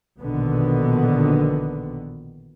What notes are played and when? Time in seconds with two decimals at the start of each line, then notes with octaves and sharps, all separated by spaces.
0.19 A#1 B2 D3 D#3 B3